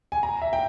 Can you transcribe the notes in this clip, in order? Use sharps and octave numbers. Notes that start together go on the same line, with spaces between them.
G#5
A#5
E5
G5